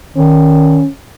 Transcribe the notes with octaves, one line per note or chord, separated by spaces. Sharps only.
D#3 C#4